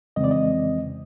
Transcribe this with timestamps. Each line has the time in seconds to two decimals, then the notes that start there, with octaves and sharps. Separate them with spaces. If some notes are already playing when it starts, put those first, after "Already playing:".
0.16 F2 C#3 E3 G#3 C4 D#5
0.24 D5
0.31 D#5